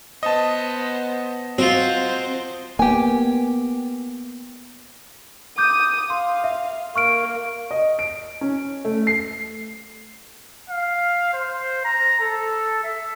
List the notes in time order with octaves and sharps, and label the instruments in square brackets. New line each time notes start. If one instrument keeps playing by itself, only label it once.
[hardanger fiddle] B3 C5 [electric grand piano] D#5 A5
[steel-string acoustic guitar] C4 [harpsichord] F4 F#4 [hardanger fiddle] C5
[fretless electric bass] A#3 B3 [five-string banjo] G4 G#5
[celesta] D6 G6 [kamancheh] D#6
[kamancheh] F5 [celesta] C6
[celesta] E5
[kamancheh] A#3 [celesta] C#6 F6 D7
[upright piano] D#5
D7
C#4
A3
C7
[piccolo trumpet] F5
C5
A#5
A4
E5